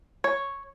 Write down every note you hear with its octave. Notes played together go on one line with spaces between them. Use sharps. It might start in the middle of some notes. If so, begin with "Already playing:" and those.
C#5